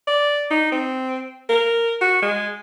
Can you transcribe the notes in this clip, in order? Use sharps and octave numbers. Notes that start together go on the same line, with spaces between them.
D5
D#4
C4
A#4
F#4
G#3